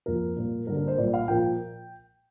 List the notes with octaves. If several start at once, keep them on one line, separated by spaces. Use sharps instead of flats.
F2 F3 A#3 A#4
A#2 G3 A#3
G2 D3 A#3 A#4
A#4
C5
A#2 G3 A#3 D5
F5
A#2 F3 A#3 G5